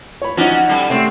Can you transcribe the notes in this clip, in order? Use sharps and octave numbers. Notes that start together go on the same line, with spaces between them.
C#5 B5
F3 C#4 D#4 F#4 D5
G3 A4
C3 A3 C4 C#4